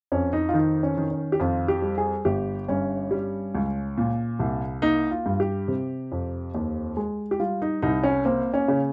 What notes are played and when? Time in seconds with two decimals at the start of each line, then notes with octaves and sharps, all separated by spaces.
0.12 F2 C#4
0.33 D#4
0.49 F4
0.54 D#3 D#4
0.83 C#4
0.97 D#3
1.11 C#4
1.32 G4
1.40 F2 F4
1.68 G4
1.82 G3
1.98 G#4
2.25 G1 G4
2.68 G2 C#4
3.11 G3
3.55 C#2
3.98 A#2
4.39 C2
4.82 A#3 D#4
5.11 F4
5.26 G2
5.40 G4
5.68 C3
6.12 F2
6.54 D#2
6.97 G#3
7.31 G4
7.40 G3 F4
7.62 D#4
7.82 C2 D#4
8.04 C#4
8.25 A#3 C4
8.54 C#4
8.68 C#3